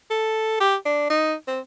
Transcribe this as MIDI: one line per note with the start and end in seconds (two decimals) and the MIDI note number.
0.10 0.58 69
0.60 0.76 67
0.85 1.09 62
1.10 1.34 63
1.47 1.60 60